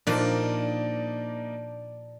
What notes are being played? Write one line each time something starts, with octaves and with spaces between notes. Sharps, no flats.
A#2 F3 A#3 D4 D#4 D5